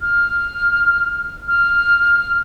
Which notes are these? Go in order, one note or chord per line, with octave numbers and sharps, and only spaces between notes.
F6
F6